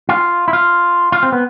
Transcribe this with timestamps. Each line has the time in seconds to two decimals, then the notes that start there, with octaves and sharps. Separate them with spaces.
0.09 F4
0.48 E4
0.53 F4
1.12 F4
1.23 C4
1.32 B3